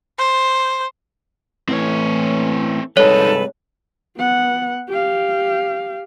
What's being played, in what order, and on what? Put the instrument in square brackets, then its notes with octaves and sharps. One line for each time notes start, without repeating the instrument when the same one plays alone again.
[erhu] C5
[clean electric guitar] A2 E3 [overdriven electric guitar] C4 C#5
[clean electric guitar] G2 C3 G#3 [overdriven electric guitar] G3 D#4 [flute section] A4 B4 [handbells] C#5
[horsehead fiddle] B3 F#5
G4 F5